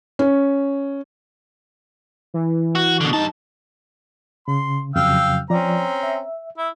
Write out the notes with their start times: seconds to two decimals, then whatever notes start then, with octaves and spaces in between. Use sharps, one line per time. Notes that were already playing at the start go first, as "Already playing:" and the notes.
0.19 C#4
2.34 E3
2.75 F#4
3.01 B2 D3
3.13 G2 D#4 A5
4.48 C#3 C6
4.96 F2 C#3 F#3 F5 G5 E6
5.50 F3 C4 C#4 D5 A#5
6.03 E5
6.58 E4